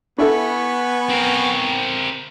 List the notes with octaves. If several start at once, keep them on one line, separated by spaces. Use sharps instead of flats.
B3 D4 E4 A4 G#5 B5 C#6
C4 A#4